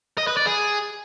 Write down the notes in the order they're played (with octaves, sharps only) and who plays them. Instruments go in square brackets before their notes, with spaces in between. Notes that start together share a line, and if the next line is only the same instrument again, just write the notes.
[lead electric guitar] D#5
B4
D5
G#4